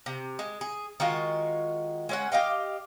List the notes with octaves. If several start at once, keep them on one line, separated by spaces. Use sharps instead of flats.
C3
G#3
G#4
D#3 G#3 F4 F#4
G#3 C#4 F#5
G4 D#5 F5 G5